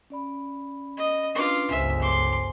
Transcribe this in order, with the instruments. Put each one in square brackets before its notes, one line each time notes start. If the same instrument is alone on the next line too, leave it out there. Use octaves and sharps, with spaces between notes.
[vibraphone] C#4 D5 B5
[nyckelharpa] D#5
[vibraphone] C#4 D4 B4 [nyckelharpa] F4 D6
[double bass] G1 C#2 [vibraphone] C5 G#5 [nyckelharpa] E5
[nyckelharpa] C6 D6